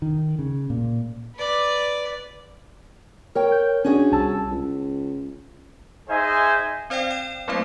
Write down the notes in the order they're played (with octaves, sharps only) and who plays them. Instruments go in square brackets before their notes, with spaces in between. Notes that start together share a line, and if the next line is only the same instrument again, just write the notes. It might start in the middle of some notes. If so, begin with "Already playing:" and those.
[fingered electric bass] D#3
C#3
A#2
[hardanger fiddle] B4 D5
[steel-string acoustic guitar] A#4 C#5 G5
[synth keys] G6
[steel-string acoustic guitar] C#4 F#4 G#4 [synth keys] D4
[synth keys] C2 A5 E6
[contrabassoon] C#2
[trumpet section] D#4 G#4 C5 D#5 E5 G#5
[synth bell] C4 C5 D5 F5 G5
G5 E7
F#3 A3 A#3 C4 E4 C5